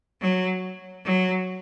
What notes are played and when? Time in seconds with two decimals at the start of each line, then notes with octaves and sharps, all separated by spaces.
0.22 F#3
1.05 F#3